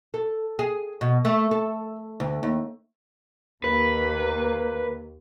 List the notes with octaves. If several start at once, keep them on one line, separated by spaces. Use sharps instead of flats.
A4
G#4
B2
A3
A4
D2
D#2
D#2 A#3 B4